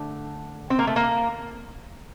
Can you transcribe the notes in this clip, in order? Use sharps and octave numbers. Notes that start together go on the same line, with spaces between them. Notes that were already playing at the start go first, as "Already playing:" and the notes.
Already playing: D3 A3
C4
A#3
A3
A#3